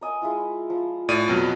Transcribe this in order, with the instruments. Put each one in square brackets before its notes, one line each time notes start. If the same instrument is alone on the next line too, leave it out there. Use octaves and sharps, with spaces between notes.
[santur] A#4 D#5 G#5
G#3 E4 F4
F3
[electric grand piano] A2 D5 D#7
[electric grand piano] F2 B2 F#3 [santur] B5